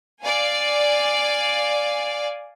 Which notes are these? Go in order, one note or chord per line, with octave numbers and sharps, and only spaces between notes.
D5 F5 G#5